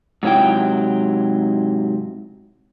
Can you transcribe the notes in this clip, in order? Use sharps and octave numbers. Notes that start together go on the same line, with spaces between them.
G#2 C3 F#3 E4 G5